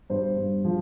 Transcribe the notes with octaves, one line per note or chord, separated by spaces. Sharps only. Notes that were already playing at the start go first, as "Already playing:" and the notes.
G2 C5
G2
F3